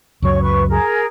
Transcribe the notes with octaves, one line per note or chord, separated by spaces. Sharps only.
C#2 F#2 F#3 C#5 C#6
B4 C#6
G#4 A#4